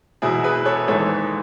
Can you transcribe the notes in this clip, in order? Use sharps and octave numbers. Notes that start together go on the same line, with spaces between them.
E1 E2 B2 E4 G#4
G#4 B4
A4 C#5
G#1 G#2 E3 A4 C#5